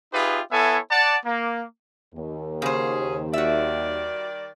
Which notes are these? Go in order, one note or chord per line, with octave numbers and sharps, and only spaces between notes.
D#4 F4 G4 G#4 B4 E5
B3 E4 A4 C#5 E5 G#5
D5 F#5 A5
A#3
D#2
C#3 C#4 F#4 G#4 C5
D#3 G3 F#4 D5 E5